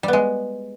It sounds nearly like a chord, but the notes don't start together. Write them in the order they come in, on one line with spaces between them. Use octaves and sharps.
G3 B3 G#3